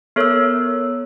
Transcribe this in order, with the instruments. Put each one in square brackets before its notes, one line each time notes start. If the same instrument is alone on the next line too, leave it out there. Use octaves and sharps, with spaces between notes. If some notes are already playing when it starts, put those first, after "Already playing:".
[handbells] B3 A4 C#5 [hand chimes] A#4 E6